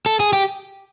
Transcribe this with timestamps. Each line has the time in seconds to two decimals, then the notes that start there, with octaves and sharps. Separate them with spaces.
0.06 A4
0.20 G#4
0.33 G4